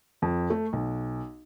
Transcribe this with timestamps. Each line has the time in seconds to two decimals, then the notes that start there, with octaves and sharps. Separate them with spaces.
0.22 F2
0.50 A3
0.73 B1